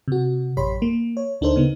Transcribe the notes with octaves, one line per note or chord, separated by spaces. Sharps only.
C3 F#4
A1 F#2 G4 C#5 B5 C6
A#3
C#5
D2 D4 D#4 A4 A#4 C5
C#3 B3 D#4